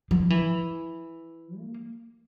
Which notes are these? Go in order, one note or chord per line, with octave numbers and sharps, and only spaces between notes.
F3
E3
A#3